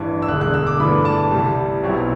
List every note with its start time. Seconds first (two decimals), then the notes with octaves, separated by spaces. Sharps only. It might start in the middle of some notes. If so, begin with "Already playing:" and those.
Already playing: A1 G2 E3
0.22 E6
0.28 E1 D2 D3 F#6
0.41 F#6
0.54 E6
0.67 D6
0.80 G1 G2 E3 A3 D4 B5
1.05 A5
1.31 C2 C3 G3
1.82 B1 B2 F#3 C4 E4